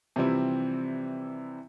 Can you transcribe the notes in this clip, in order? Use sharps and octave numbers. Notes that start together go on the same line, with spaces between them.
C3 E3 F3 G3 C4 E4